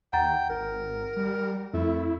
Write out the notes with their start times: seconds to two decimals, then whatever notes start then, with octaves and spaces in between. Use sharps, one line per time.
0.13 D#2 F#5 G5 A#5 A6
0.49 G#1 A#4
1.16 G3
1.74 F2 A3 E4